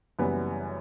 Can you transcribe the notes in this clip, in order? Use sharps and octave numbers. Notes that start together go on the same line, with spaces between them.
F#1 F#2 E3 G3 B3